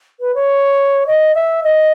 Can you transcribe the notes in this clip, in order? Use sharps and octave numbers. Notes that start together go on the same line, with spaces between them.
B4
C#5
D#5
E5
D#5